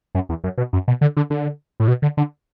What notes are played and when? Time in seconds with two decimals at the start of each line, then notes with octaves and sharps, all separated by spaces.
0.15 F#2
0.29 E2
0.44 F#2
0.58 B2
0.73 F#2
0.88 B2
1.01 D3
1.17 D3
1.30 D3
1.80 A2
1.88 B2
2.02 D3
2.17 D3